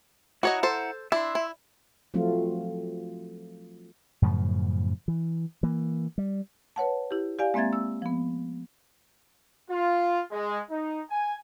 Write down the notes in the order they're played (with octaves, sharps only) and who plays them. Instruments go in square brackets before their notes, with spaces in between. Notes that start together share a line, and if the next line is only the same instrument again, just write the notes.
[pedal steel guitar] E4 F#5 A#5 [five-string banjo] F#4 C#5 D#5
[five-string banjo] A4 C5
[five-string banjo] D4 E4 [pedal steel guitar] E5 C6
[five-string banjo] E4
[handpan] F3 F#3 A3 C4 F4
[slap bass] F#2 A2 C#3 F3
E3
E3 A#3
G3
[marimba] B4 C#5 F#5 A5
E4 G4
G4 D5 F5 G#5
G#3 A#3 C4 E5 G#6 A6
E6
F3 B3
[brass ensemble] F4
G#3
D#4
G#5